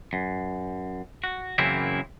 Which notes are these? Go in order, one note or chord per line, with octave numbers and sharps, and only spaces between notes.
F#2
F#4
F#2 C#3 E3 A#3 C4 E4